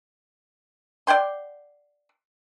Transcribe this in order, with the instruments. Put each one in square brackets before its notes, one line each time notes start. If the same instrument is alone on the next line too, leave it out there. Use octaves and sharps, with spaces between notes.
[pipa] D5 F#5 G5 C6